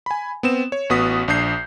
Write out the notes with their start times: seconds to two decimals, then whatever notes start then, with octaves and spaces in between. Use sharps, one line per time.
0.06 G#5 B5
0.43 B3 C4 E7
0.72 C#5
0.90 A1 B3 F#4 D#6 B6
1.28 A#1 D4 D#6 G6 C7